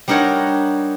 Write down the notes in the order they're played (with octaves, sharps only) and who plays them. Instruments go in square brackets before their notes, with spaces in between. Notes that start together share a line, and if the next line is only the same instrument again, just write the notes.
[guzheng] G3 D4 D#4 A#4 C#5 F#5